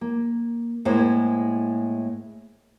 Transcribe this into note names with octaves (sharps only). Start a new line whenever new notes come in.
A#3
A2 G#3 A#3 C5